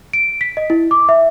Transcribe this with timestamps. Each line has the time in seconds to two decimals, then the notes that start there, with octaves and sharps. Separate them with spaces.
0.13 D7
0.41 B6
0.57 D#5
0.70 E4
0.91 D6
1.09 E5